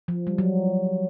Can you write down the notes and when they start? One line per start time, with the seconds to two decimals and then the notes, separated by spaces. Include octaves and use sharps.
0.08 F3
0.27 G3
0.38 F#3